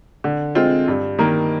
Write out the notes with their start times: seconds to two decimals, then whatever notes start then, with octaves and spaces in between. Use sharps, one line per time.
0.24 D3
0.55 G#3 C4 F4
0.88 G2
1.19 D#3 A#3